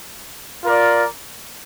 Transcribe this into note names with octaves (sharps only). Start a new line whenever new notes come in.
F4 A#4 D5